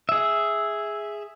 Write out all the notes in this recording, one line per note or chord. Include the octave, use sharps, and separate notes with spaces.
G#4 E5